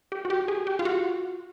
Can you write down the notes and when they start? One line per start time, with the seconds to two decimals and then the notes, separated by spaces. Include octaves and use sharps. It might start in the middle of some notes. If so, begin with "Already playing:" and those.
0.12 G4
0.25 F#4
0.30 G4
0.48 G#4
0.67 G4
0.79 F4
0.85 F#4